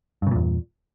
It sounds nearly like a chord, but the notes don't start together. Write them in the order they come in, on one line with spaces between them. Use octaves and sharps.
G2 C#3 A#2 E2